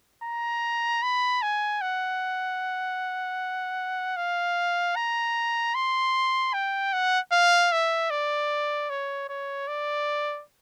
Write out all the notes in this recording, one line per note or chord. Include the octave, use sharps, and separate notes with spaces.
A#5
B5
G#5
F#5
F5
A#5
C6
G5
F#5
F5
E5
D5
C#5
C#5
D5